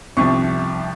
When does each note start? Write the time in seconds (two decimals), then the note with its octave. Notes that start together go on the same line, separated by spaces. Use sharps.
0.17 C2 C3 F3 C#6